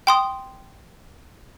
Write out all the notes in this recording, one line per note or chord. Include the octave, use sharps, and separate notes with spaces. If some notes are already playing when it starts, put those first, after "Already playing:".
G5 C6 D#6